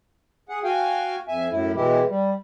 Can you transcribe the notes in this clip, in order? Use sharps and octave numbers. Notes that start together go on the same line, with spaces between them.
G#4 F#5
F#4 F5 G5 G#5
F2 E5 G#5
F#2 A2 E4
B2 E3 G#3 E4 G4
G3